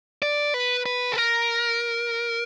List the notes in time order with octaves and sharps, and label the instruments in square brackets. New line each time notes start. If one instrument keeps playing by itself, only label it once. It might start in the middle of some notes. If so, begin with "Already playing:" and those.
[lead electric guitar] D5
B4
B4
A4
A#4